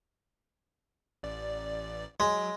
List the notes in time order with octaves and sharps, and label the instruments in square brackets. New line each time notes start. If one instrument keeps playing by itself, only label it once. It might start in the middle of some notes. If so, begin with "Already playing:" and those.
[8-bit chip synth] A1 D5
[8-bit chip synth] F#3 [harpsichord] G#3